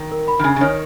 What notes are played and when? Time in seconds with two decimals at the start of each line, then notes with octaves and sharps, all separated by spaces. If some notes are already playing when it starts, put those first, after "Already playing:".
Already playing: D#3
0.12 A#4
0.28 B5
0.39 D#3
0.44 C#3 G#5
0.56 C#3
0.61 D#3 C#5